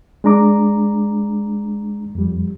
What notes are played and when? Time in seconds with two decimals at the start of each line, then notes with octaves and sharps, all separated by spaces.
0.24 G#3 D4 A#5 D6
2.15 F2 G3